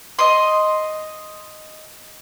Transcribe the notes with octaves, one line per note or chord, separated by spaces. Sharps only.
D#5 C6